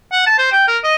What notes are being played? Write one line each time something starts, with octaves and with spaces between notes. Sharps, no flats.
F#5
A5
C5
G5
A#4
D#5